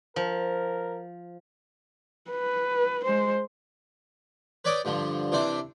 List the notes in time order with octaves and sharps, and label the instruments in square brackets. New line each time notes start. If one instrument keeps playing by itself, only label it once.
[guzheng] F3 [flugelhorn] A#4
[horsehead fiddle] B4
G#3 C5
[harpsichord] B4 C#5 D5 G5 D6 D#6
G2 D3 F3 G3
C3 E3 D4 C5 E5 D6